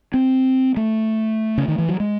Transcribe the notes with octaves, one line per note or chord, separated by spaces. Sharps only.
C4
A3
C#3
D#3
E3
F#3
G#3